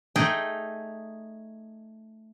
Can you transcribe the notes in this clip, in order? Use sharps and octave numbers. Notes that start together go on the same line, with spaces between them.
A3 D#4 G#4 D#5 G5